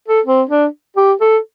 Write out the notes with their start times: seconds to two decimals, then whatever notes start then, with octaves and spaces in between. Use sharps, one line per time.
0.08 A4
0.26 C4
0.50 D4
0.96 G4
1.21 A4